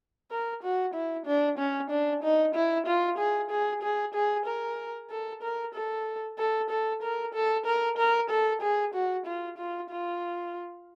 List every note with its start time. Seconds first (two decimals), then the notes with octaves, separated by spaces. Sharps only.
0.31 A#4
0.63 F#4
0.94 E4
1.26 D4
1.58 C#4
1.90 D4
2.23 D#4
2.55 E4
2.86 F4
3.18 G#4
3.50 G#4
3.82 G#4
4.14 G#4
4.46 A#4
5.10 A4
5.43 A#4
5.74 A4
6.39 A4
6.70 A4
7.02 A#4
7.34 A4
7.66 A#4
7.97 A#4
8.30 A4
8.62 G#4
8.94 F#4
9.26 F4
9.58 F4
9.90 F4